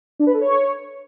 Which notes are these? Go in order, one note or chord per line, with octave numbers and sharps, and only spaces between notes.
D4
B4
A4
C#5